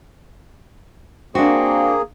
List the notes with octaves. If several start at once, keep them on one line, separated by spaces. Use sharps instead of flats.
A#3 C4 D4 F#4 G#4